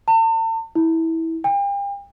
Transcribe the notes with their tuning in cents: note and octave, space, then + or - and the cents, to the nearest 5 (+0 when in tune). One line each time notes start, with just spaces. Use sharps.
A5 +45
E4 -20
G5 +40